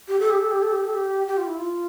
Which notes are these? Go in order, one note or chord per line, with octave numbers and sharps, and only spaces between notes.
G4
A4
G4
A4
G4
A4
G4
A4
G4
G4
F4
E4
F4